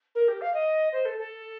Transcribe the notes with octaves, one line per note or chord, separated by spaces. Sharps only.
A#4
G4
F5
D#5
C5
A4
A4